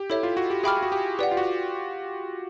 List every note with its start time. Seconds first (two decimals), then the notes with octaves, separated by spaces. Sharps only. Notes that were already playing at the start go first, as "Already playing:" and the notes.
Already playing: G4
0.10 E4 A4 C#5 E5
0.23 F4
0.37 F#4
0.50 G4
0.63 G#4 E5 G5 B5 D6 F6
0.83 F#4
0.92 G4
1.19 G4 B4 D5 F#5
1.31 F4
1.37 F#4